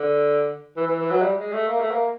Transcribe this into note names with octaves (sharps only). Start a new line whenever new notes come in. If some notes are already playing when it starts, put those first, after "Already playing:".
Already playing: D3
E3
E3
E3
F#3
G3
G#3
A3
A#3
A3
A#3